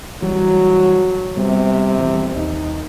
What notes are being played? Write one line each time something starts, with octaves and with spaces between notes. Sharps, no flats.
E3 F#3 G3
C3 G3 B3
D#1 E3 G3
D#2 D#4